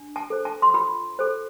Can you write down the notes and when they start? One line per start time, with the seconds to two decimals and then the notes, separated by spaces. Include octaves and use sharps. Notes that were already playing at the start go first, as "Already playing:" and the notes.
Already playing: D4
0.16 A5
0.30 A4 C5
0.45 A5
0.62 C6
0.74 F4 B5
1.19 A4 C5